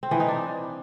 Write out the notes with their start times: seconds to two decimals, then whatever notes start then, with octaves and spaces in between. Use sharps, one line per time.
0.03 C4
0.11 E3
0.20 D#4
0.28 D4